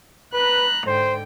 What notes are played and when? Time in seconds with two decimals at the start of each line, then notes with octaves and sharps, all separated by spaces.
0.33 B4 A#5 B5 F#6
0.87 G#2 D3 C5 G5